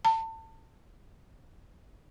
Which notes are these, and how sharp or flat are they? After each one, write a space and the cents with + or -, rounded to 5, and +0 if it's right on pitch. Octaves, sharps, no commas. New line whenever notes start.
A5 +30